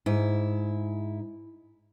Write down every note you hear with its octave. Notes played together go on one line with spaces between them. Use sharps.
G#2 E4